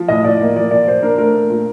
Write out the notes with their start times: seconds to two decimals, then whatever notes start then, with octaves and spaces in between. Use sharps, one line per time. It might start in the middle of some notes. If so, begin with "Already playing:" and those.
Already playing: F3
0.08 A2 D#5
0.24 A2 D5
0.41 A#3
0.56 F3 D5
0.71 A#2 D5
0.87 A#2 C5
1.03 D4 A#4
1.18 A3 A#4
1.34 A#2
1.50 A#2